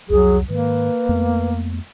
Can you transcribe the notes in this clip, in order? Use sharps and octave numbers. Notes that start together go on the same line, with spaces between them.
C2 F2 F#3 G#4
G#2 D#3 A#3 B4
F2 A3 B3